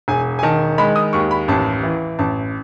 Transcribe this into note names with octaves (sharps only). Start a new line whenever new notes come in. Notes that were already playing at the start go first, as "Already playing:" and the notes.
E1 G#5
G#5
D#3 A5
G#3 B5
D#6
D#2 C#6
B5
A1 A5
E3
A1 A5